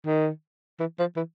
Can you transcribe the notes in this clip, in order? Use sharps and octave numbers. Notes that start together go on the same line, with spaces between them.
D#3
E3
F3
E3